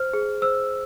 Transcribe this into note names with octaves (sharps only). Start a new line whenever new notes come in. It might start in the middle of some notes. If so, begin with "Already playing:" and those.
Already playing: C5 F6
G#4
C5 E6